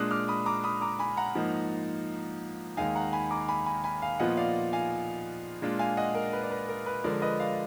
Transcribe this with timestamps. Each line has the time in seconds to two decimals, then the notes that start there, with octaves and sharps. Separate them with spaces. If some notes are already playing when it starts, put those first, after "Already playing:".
Already playing: A#2 G#3 D4 D#6 F#6
0.11 D6 F6
0.28 B5 D#6
0.46 A#5 D6
0.64 B5 D#6
0.81 A#5 D6
0.99 G#5 B5
1.17 F#5 A#5
1.35 G#2 F3 A#3 D#4
2.77 D#2 D#3 G#3 D#4 F5 G#5
2.95 F#5 A#5
3.13 G#5 B5
3.31 A#5 D6
3.48 G#5 B5
3.66 G#5 B5
3.84 G#5 B5
4.02 F5 G#5
4.19 A#2 F3 B3 F4 D#5 F#5
4.37 D5 F5
4.73 F5 G#5
5.62 A#2 G#3 D4 F4
5.79 F5 G#5
5.97 D#5 F#5
6.15 A#4
6.33 B4
6.43 D5
6.51 B4
6.69 A#4
6.86 B4
7.04 D3 F3 G#3 A#4 D5
7.22 B4 D#5
7.40 D5 F5